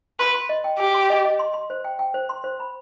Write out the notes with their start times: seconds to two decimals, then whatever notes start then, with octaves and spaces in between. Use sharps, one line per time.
0.20 B4 C6
0.34 C6
0.49 D#5
0.64 G5
0.79 G4 G5
0.94 C6
1.10 D#5
1.25 D#5
1.39 C6
1.54 C6
1.70 C5
1.84 G5
1.99 G5
2.14 C5
2.29 C6
2.44 C5
2.60 B5